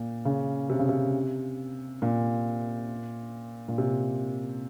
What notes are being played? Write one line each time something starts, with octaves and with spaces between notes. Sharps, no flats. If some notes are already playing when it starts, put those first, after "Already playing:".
Already playing: A#2
C#3
C3
C#3
C3
A#2
A#2
C3